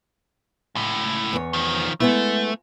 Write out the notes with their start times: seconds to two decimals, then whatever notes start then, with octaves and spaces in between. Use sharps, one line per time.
0.75 C#2 A2
1.33 E2 C#5
1.53 D#3 F3
2.00 G#3 A3 B3 E4